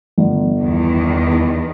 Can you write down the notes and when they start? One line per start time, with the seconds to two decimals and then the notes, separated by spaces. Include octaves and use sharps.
0.18 G1
0.60 E2 D#3